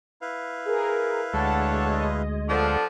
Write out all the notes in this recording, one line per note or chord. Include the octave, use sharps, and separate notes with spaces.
E4 B4 F5
G#4 A#4
D2 G#3 D4 A4 C#5 F#5 A5
D#5
F3 B3 D4 F4 A4 F#5